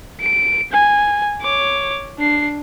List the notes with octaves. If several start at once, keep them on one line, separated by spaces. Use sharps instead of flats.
D7
G#5
C#5 D6
D4 C7